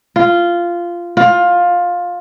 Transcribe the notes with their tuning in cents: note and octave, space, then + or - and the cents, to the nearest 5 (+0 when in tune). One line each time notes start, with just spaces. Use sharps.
F4 -10
F4 +15